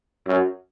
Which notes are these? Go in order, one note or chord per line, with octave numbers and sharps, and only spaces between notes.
F#2